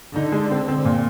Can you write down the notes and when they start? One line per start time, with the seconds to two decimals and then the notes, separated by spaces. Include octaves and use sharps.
0.15 D3 D#4
0.32 G#3
0.51 C4
0.68 C4
0.85 A#2